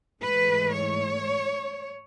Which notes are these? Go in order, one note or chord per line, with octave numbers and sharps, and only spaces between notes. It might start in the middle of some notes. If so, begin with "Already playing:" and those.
G#2 E3 A3 B4
C#5